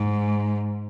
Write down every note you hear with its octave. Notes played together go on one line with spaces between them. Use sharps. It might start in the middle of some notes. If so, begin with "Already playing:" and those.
Already playing: G#2